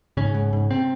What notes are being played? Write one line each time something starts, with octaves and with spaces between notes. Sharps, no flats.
G#2 C#3 C#4
G#2
G#2
C3 C4